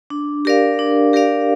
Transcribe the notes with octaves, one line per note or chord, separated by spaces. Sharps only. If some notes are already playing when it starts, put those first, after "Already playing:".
D4
G4 A#4 D5 F5
D4
G4 A#4 D5 F5